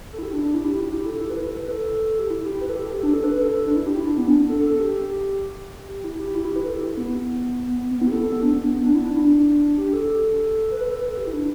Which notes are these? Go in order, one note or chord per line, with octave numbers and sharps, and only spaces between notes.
A4
E4
G4
D4
D4
E4
G4
E4
G4
A4
E4
B4
A4
B4
B4
A4
G4
E4
G4
B4
A4
G4
A4
G4
D4
A4
B4
A4
D4
E4
G4
E4
D4
B3
D4
A4
A4
A4
G4
G4
E4
G4
E4
G4
B4
A4
G4
E4
B3
B3
E4
G4
A4
A4
B3
D4
B3
D4
E4
D4
D4
G4
A4
B4
A4
B4
A4
G4
E4
D4